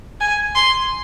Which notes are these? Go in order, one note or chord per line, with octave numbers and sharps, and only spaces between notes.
G#5
C6